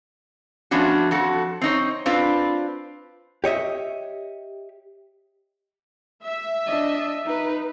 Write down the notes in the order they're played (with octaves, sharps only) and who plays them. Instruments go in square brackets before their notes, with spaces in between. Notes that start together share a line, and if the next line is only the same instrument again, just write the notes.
[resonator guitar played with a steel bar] F3 A3 B3 C#4 D4 F#4
F2 F#4 A4
C4 D#4 C#5
C4 D4 F4 B4
[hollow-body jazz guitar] G4 C#5 D#5 E5
[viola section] E5
[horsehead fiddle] D4 D#5
D#4 B4